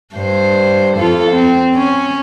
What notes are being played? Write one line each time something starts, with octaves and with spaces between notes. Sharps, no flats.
G2 C5
F2 F4 A4
C4
C#4